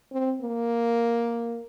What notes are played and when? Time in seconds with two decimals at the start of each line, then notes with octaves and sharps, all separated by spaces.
0.12 C4
0.41 A#3